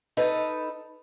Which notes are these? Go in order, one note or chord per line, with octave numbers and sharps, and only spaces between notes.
D#4 A4 B4